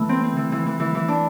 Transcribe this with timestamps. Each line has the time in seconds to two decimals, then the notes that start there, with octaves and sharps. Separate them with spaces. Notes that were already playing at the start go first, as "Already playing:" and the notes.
Already playing: E3 A3
0.09 C4
0.23 C4
0.36 E3
0.52 E3
0.66 E3
0.80 E3
0.95 E3
1.08 D4